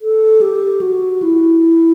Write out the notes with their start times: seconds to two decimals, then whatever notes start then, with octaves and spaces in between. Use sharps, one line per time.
0.02 A4
0.41 G4
0.81 F#4
1.22 E4